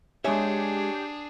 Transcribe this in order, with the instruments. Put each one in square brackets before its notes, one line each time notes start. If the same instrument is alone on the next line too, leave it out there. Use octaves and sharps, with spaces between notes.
[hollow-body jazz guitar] G#3 E5 [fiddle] D4 G#4 [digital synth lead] G4 [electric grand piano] C#5 G#5